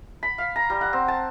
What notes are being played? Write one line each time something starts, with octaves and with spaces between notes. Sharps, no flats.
B5
F5
A#5
G3
F#5
C4
A5